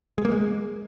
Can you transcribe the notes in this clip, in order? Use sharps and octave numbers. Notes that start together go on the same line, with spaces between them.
G#3
A#3
G#3